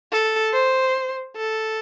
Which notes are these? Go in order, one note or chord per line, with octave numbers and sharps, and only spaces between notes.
A4
C5
A4